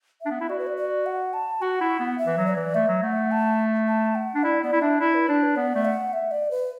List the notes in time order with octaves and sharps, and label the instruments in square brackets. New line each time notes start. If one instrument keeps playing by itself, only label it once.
[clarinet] D4 [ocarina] E5
[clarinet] B3
E4
[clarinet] F#4 [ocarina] D5
[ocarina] B4
D5
D5
F#5
A5
[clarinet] F#4 [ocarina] F#5
[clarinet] E4
B3
[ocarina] E5
[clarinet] E3
F#3
[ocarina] D5
[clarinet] E3
[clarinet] A3 [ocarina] E5
[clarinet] F#3
[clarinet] A3 [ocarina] F#5
[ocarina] A5
A5
F#5
[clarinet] D4
[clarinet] E4 [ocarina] D5
[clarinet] B3 [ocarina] D5
[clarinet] E4
[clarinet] D4 [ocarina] E5
[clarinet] E4 [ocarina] D5
[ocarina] B4
[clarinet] D4 [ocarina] D5
[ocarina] B4
[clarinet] B3 [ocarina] D5
[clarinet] A3
[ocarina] F#5
E5
D5
B4